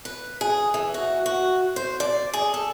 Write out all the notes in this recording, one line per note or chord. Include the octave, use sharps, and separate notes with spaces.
B4
G#4
E3
F#4
F#4
C5
D5
G#4
A4